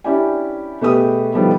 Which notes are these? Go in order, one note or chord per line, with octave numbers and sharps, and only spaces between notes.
C#4 D4 E4 G4 D5 G#5
B2 A3 G4 G#4 B4 D#6
B2 D#3 F3 G3 A3 B3